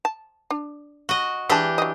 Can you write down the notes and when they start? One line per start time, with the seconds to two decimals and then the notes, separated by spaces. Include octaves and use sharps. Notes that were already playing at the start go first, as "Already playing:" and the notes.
0.05 A5
0.51 D4
1.09 F#4 D#5
1.49 E3 G#3 D4 G4 A5
1.78 F#3 D#5